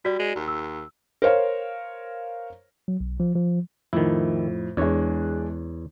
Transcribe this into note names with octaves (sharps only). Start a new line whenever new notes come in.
G3 F#4 D5
G#3
D#2
E6
A#4 C5 C#5 F5
F#3
B1
F3
F3
F2 A2 D#3 E4
E2 G#3 D4 C#5